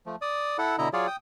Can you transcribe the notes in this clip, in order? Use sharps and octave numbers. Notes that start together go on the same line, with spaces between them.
F3 A3
D5 D#6
E4 A4 F#5
B2 D3 E4 D#5 A#5
F#3 F4 G#4 C#5 D5
G5 D#6